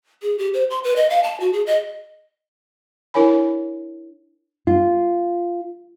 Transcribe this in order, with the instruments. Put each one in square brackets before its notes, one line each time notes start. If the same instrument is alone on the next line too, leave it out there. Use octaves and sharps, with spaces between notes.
[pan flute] G#4
G4
C5
C6
B4
D#5
F5
A5
F#4
G#4
D#5
[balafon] D4 E4 A#4 C#5 G#5 B5
[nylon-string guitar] F4